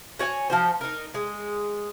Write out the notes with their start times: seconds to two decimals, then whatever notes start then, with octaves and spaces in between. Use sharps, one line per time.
0.19 F#4 C#5 D#5 G#5
0.50 F3 F#4 C5
0.81 D#4 A#4
1.14 G#3